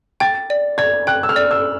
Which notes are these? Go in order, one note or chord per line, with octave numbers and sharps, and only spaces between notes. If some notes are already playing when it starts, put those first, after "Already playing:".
G5 A6
D5
D5 G#6
G5 F#6
E6
F6
D5
E6